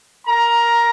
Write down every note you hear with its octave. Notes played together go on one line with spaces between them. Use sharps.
A#4 A#5